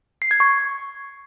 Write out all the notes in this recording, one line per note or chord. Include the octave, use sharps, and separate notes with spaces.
C7
G#6
C#6